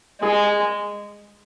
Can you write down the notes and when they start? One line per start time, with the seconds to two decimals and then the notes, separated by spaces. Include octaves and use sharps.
0.22 G#3 G#4